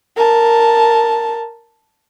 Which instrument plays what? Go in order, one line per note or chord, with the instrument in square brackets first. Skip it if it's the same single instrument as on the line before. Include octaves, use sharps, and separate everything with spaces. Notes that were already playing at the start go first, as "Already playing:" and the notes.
[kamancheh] A#4 A5